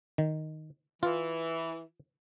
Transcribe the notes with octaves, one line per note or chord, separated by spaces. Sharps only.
D#3
E3 F4